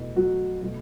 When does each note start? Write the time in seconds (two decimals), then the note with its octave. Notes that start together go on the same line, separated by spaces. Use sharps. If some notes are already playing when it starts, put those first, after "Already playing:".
Already playing: E2 B2 A3
0.16 F#3 F#4
0.61 B2 F#3 A3